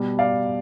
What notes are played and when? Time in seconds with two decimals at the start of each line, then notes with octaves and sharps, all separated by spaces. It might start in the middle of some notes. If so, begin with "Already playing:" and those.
Already playing: B2 G3
0.19 D5 F5